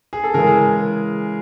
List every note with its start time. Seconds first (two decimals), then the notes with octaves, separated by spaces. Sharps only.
0.13 G#4
0.24 A4
0.34 C#3 E3 G#3 G#4 A#4